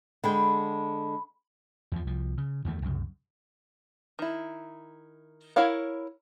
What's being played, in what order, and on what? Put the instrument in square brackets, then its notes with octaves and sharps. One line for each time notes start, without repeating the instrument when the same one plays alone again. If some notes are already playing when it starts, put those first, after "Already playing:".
[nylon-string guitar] D3 G#3 G5 [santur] B5
[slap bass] E2 F3
C2 F3
C#3
E2 D#3 A3
C2 F#2 C#3
[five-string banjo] D#3 E4
E4 A#4 C#5 F5 F#5